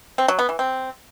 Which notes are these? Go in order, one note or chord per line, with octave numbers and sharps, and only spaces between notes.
C4
F#3
B3
E3
C4